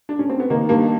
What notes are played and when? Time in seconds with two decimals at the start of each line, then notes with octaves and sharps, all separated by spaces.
0.09 D4
0.19 C#4
0.30 C4
0.40 B3
0.50 D#3 A#3
0.69 G2 A#3